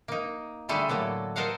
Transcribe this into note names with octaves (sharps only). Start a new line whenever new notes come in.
A#3 D#4
D3 G3 A3 G#4 A4
A2 F#3 A#3 A4
A4 A#4 C5 D#5 F5 F#5